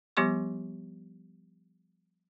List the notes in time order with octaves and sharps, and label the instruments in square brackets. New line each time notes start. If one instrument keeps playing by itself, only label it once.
[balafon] F3 G3 B3 G4 C6 C#6